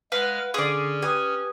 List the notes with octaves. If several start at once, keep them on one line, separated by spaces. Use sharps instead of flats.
G#3 B4 F5 F#5 F6
D3 C#4 G#4 D5 C6
G4 B4 G#5 D#6